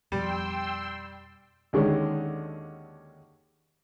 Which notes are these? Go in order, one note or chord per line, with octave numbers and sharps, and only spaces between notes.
F2 B2 F3 G3 G5 C6 E6
D#2 D3 D#3 G#3 C#4